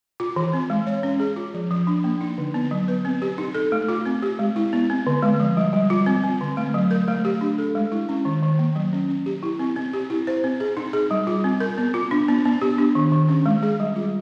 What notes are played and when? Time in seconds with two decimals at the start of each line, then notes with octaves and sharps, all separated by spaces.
0.20 F4
0.36 E3
0.53 C4
0.70 G#3
0.87 C#5
1.03 C#4
1.20 G#4
1.36 F4
1.54 F3
1.71 F3
1.87 D4
2.04 A#3
2.21 D#4
2.38 D3
2.54 B3
2.71 F#3
2.88 B4
3.05 C4
3.22 G4
3.38 D#4
3.55 A4
3.72 A3
3.88 F4
4.06 C4
4.22 G4
4.39 G#3
4.56 E4
4.73 B3
4.90 C4
5.07 D3
5.22 G#3
5.40 F3
5.57 G3
5.73 G3
5.90 F4
6.06 C4
6.24 C4
6.41 D3
6.57 A3
6.74 F#3
6.91 A#4
7.08 A3
7.25 G4
7.41 D4
7.58 A4
7.75 G#3
7.92 E4
8.09 C#4
8.25 D#3
8.43 D#3
8.59 A#3
8.76 F#3
8.93 C#4
9.09 C#4
9.26 G4
9.43 E4
9.59 C4
9.76 C4
9.93 G4
10.10 E4
10.27 C5
10.44 C4
10.60 G#4
10.77 D#4
10.93 G#4
11.11 G3
11.27 F4
11.44 C4
11.60 A#4
11.78 B3
11.94 F4
12.11 D4
12.28 B3
12.45 B3
12.62 G4
12.78 D4
12.95 D#3
13.12 D#3
13.29 C#4
13.46 G#3
13.63 G#4
13.80 G3
13.96 F4